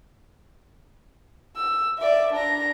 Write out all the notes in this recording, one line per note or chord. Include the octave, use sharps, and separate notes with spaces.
E6
D5 E5
D4 A#5